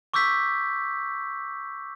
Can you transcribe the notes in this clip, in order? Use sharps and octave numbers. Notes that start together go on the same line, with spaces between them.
C#6 D6 E6 G6 B6